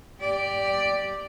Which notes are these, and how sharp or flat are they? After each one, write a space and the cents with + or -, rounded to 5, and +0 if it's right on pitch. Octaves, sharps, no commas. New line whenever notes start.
G4 +0 D5 +0